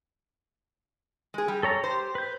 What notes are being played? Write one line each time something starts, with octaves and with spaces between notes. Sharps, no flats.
G#3 G#4
G3
A4 C#5 A#5
G4 C5
B4 G6